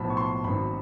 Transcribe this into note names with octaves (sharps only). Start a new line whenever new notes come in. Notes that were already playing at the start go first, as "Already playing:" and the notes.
Already playing: B1 A2 F3 B5
C#6
C6
G#1 F#2 D#3 B5